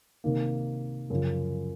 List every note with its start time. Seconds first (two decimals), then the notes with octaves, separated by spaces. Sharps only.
0.24 C3 D#3 A#3
1.10 F#2 C#3 F3